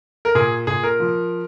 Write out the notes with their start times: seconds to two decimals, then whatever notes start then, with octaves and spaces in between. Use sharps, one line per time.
0.25 A#4
0.35 A#2 G#4
0.67 A#2 G#4
0.83 A#4
1.00 F3